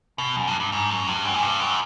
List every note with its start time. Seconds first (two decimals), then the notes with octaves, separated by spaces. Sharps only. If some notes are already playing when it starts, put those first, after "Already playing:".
0.18 B2
0.36 F#2
0.47 G2
0.60 G2
0.72 G#2
0.90 F#2
1.07 G2
1.25 F#2
1.34 G#2
1.43 G2
1.60 F#2